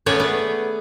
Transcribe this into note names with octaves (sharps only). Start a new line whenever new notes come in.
A3 B3 C#4 G#4 C#5 D5
B3